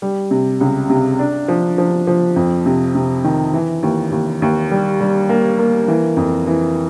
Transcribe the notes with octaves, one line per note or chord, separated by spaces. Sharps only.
G3
C3
C#2
C3
D4
F3
F3
F3
F2
C3
C3
D#3
E3
D#2
D#2
D#2
G3
G3
A#3
A#3
E3
F2
E3